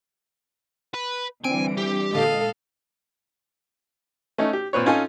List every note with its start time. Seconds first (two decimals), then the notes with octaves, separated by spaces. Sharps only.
0.94 B4
1.44 D3 E3 G3 C4 G#5 D7
1.77 G4
2.13 A#2 D3 G#3 A4 D#5 F5
4.38 A3 C#4 D#4
4.53 G4
4.73 A#2 C4 B4 C#5
4.86 C#4 D#4 F4 A4 G#5